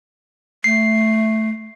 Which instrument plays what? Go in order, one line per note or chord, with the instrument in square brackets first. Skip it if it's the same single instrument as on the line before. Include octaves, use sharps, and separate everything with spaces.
[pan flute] A3 [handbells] C7